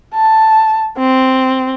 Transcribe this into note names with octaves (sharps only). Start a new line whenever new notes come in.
A5
C4